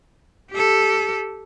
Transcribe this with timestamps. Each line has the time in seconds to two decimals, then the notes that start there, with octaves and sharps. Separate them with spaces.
0.51 G4 A4